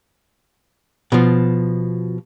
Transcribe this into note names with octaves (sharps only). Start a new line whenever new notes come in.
B2 F3